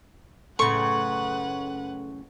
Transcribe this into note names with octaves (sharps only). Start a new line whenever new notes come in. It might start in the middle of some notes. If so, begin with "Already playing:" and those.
F#2 A2 C#3 A4 B4 F#5 C6 C#6